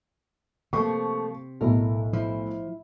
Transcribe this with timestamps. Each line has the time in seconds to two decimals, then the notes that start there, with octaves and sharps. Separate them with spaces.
0.73 C3 F3 A3 A#3 C#6
1.61 B1 A2 A3 A#4
2.13 F3 E4